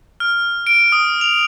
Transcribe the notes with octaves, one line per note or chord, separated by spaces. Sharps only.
F6
D7
D#6
F7